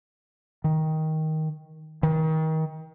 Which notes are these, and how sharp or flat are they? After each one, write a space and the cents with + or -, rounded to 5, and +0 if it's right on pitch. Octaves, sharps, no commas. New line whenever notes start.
D#3 +15
D#3 +30